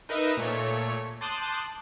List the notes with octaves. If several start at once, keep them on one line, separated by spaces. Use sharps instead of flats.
D#4 A#4 B4 D#5 E5
A#2 A3 C#5
A5 C6 D6 D#6 F#6 G6